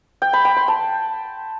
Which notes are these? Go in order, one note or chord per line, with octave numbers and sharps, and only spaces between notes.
G5
B5
G5
C6
A5